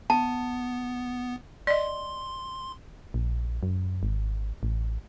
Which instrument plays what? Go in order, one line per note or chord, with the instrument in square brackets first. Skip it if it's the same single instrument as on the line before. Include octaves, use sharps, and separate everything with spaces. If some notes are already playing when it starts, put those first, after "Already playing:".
[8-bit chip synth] B3 [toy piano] A5
[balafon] D5 D#5 [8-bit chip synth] C6
[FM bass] A#1
F#2
G#1
A1